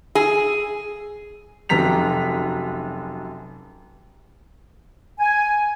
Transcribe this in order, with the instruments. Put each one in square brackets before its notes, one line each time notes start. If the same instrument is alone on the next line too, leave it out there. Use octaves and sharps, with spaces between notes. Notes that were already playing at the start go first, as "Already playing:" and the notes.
[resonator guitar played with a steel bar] G#4
[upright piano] F1 F#2 A#5 B6 F7
[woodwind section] G#5